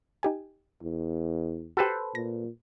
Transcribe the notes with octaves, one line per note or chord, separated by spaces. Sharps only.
D#4 G4 G#5
E2
F#4 G4 A4 B4 C5
A#2 A#6